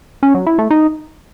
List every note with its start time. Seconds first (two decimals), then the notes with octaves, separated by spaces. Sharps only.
0.23 C#4
0.35 F#3
0.47 E4
0.58 A3
0.70 D#4